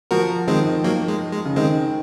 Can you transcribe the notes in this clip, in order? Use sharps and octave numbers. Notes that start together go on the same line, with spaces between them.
F3 F#4 A#4
D#3 G#3 C4
D#3
F#3 A#3
G#3
G#3
C#3
D#3 G#3 C4